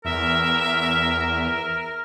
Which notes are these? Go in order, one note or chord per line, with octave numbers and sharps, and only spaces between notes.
E2 A#4 E5